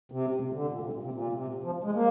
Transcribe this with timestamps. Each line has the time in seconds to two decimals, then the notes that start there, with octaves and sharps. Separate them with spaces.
0.12 C3
0.31 C3
0.43 C3
0.52 D3
0.72 A#2
0.83 C3
0.93 A#2
1.03 C3
1.13 A#2
1.33 C3
1.64 F3
1.84 G#3
1.94 A#3